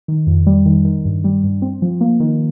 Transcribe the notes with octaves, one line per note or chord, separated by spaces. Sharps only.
D#3
F2
G3
D#3
D#3
G2
G3
G2
C4
F3
A#3
D#3